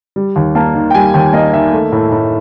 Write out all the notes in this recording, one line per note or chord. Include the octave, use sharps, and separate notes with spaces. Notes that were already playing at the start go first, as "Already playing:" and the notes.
G3
D#2
A#3 A5
D#3
G5
G3 G#5
D#2 G5
A#3 D#5
D#3 E5
A3
A2
A2